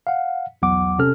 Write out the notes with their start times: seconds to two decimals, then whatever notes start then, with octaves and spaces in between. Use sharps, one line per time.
0.07 F5 F#5
0.62 B1 E2 F#3 F#5 D6
0.99 C3 C#4 A4 F6